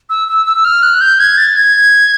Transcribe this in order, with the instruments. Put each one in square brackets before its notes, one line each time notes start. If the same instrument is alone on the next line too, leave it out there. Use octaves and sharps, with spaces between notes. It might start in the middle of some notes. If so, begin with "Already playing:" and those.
[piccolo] E6
E6
E6
E6
F6
F#6
G6
G#6
A6
G#6